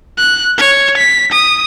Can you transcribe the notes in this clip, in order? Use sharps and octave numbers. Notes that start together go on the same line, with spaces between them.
F#6
C#5
B6
D#6